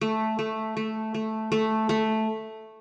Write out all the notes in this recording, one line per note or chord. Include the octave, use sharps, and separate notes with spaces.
A3
A3
A3
A3
A3
A3